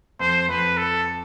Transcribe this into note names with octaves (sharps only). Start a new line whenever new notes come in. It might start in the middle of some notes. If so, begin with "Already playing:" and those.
F2 C5
F2 B4
A4